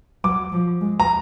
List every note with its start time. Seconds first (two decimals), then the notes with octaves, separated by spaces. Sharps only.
0.24 F#3 D6
0.52 F3
0.81 G#3
1.00 A#5